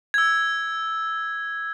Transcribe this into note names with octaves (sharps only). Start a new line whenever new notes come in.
E6 G#6